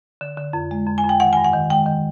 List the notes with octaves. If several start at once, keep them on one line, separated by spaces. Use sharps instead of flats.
D3
D3
F2
G#3
F2
G#5
F2
G5
D#3 F#5
G#5
G2
F#5
D#3
G#3 G5
D#3